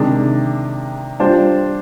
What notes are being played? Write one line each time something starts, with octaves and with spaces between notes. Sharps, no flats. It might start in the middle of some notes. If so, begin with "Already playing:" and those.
Already playing: C3 D#3 G#3 D4
G3 D4 F4 C5